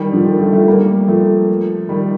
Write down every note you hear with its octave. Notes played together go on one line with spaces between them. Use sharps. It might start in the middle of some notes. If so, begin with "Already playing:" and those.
Already playing: D#3 G3
D3 F3
D#3 G3
F3 A3
F3 A3
G3 A#3
F3 A3
D#3 G3